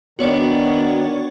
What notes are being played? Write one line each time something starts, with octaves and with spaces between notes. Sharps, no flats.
D#3 B3 D4 F#4 C#5 D5